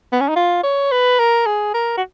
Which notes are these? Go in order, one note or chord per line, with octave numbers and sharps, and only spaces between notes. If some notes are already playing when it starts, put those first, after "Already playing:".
B3
C#4
D#4
F4
C#5
B4
A#4
G#4
A#4
F#4